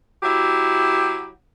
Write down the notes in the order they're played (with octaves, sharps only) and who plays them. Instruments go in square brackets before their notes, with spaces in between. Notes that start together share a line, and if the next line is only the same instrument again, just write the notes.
[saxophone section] F#3 E4 G4